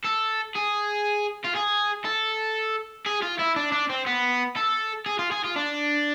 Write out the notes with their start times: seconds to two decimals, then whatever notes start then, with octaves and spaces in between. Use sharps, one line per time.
0.05 A4
0.55 G#4
1.45 F4
1.56 G#4
2.05 A4
3.06 G#4
3.22 F4
3.39 E4
3.56 D4
3.72 D4
3.90 C4
4.06 B3
4.56 A4
5.06 G#4
5.19 F4
5.31 G#4
5.44 F4
5.56 D4